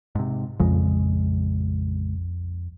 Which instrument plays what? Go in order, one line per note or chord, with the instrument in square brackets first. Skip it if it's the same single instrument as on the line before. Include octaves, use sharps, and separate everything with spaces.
[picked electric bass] G#2 C3
[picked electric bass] A#1 C#3 G#3 [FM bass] F2